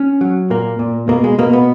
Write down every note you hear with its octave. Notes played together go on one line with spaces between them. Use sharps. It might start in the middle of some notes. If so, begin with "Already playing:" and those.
Already playing: C#4
F#3
A#2 A#3
A#2
B2 A#3
G#3
B2 A#3
B3